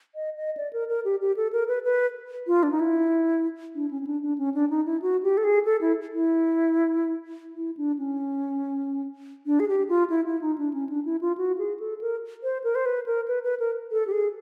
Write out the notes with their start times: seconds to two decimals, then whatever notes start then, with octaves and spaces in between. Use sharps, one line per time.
0.15 D#5
0.36 D#5
0.57 D5
0.73 A#4
0.89 A#4
1.05 G4
1.21 G4
1.37 A4
1.53 A#4
1.68 B4
1.84 B4
2.47 F4
2.63 D4
2.71 D#4
2.80 E4
3.75 D4
3.91 C#4
4.02 C#4
4.07 D4
4.22 D4
4.38 C#4
4.54 D4
4.70 D#4
4.86 E4
5.02 F#4
5.23 G4
5.37 A4
5.44 G#4
5.65 A4
5.81 E4
6.13 E4
7.56 E4
7.77 D4
7.99 C#4
9.46 D4
9.60 G#4
9.68 G4
9.89 F4
10.10 E4
10.26 E4
10.41 D#4
10.58 D4
10.73 C#4
10.89 D4
11.05 E4
11.21 F4
11.38 F#4
11.58 G#4
11.80 A4
12.01 A#4
12.43 C5
12.64 A#4
12.75 C5
12.86 B4
13.06 A#4
13.28 B4
13.44 B4
13.60 A#4
13.91 A4
14.07 G4
14.12 G#4